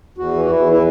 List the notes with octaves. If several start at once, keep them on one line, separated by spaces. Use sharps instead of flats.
E2 F#4
E3
F#4
E2 E4
E3
E4